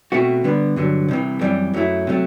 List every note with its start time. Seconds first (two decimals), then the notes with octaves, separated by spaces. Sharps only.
0.12 B2 A3 C4 F#4
0.44 D3 G3 B3
0.76 G2 D3 F#3
1.09 C2 C3 E3
1.41 F#2 E3 G3 C4
1.74 F#2 F#3 A3 E4
2.07 C3 F#3 A3